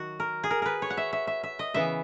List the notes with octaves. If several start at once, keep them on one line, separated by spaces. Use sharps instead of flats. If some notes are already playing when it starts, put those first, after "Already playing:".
Already playing: D#3 F#3 F#4
A#4
G#4
A#4
A#4 B4
C#5
F#5
E5
E5
E5
E5
D#5
C#3 E3 B3 E5